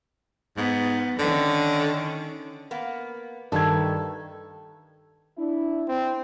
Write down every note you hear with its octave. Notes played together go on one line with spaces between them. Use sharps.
G#2 B3
D3 D#3 C#4
A#3 B3
G2 D#3 A3 A4 G#6
D4 E4
C4